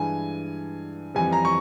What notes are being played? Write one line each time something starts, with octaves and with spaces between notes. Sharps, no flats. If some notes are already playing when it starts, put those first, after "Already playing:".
Already playing: G2 E3 G#3 G#5
F2 E3 G3 G#5
A#5
C#6